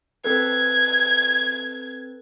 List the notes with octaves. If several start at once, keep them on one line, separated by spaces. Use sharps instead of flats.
C4 A4 B4 G#6